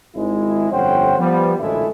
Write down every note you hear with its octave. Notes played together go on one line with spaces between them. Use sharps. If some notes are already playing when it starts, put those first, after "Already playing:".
G#1 G#3 E4
G1 F2 C#4 C5 F#5 G5
F3 G3 B3
A1 D2 A#2 G#3 A3 E4